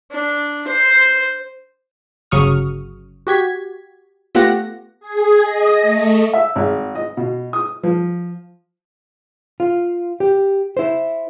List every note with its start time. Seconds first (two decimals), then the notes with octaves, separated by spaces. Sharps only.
0.12 D4
0.67 C5
2.31 G1 C#3 F#3 C#6 D#6 F6
3.27 F#4 G4 G#6 B6
4.35 A3 B3 F4 G4 F#5 A#6
5.00 G#4
5.43 D#5
5.81 A3
6.33 E5
6.56 G#1
6.95 D#5
7.17 B2
7.53 D#6
7.83 F3
9.60 F4
10.20 G4
10.77 E4 C5